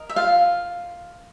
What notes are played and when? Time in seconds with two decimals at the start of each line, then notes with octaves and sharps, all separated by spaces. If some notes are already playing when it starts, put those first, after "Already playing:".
Already playing: A#4 D#5
0.09 E5
0.16 F4 F5